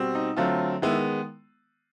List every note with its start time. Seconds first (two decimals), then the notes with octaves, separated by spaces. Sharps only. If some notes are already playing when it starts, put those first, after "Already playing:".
Already playing: B2 G3 C4
0.15 D#4
0.37 D3 F#3 A3 C4 F4
0.82 D#3 G#3 B3 E4